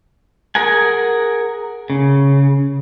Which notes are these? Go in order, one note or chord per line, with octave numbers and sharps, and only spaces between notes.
G#4 A#4 F#5 G#5
C#3